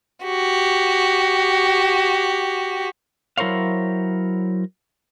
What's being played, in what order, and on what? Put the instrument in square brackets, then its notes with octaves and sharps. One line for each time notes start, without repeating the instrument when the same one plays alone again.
[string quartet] F#4 G4
[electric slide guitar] F#3 E4 A#4 C5 C#5 F5